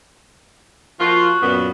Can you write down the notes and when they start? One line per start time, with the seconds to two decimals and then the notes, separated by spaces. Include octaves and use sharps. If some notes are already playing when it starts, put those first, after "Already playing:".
1.00 F3 A#3 F4 F#4
1.43 F#2 A#2 B3